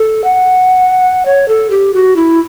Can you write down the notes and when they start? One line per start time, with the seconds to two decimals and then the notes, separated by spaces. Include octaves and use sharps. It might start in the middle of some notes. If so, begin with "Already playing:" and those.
Already playing: A4
0.24 F#5
1.26 C#5
1.48 A4
1.71 G4
1.94 F#4
2.16 E4